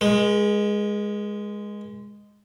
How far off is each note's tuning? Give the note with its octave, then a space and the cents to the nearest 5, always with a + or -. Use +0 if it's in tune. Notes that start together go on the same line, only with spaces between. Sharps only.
G#3 -5 A#4 +45